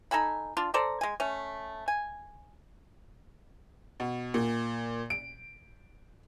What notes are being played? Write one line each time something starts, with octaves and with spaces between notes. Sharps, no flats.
D#4 A4 G#5 B5
D4 F4
A4 C5 D5 A#5
G#3 G#5
A3 C#4
G#5
B2
A#2
D7